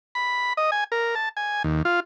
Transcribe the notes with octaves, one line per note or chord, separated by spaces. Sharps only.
B5
D#5
G#5
A#4
A5
G#5
D#2
F4